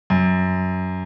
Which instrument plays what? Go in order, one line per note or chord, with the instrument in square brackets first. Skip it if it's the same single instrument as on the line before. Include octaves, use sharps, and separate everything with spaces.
[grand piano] F#2